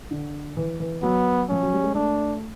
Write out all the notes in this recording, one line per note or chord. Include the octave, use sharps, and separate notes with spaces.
D3
E3
E3
F#3 B3
F3 C#4
F#3
G3
G#3
A3 D4